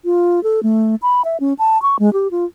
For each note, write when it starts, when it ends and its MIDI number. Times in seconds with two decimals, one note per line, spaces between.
0.05 0.43 65
0.43 0.63 69
0.63 0.95 57
1.02 1.22 83
1.25 1.37 76
1.40 1.54 61
1.59 1.81 81
1.82 1.97 85
1.99 2.13 56
2.13 2.28 67
2.31 2.45 65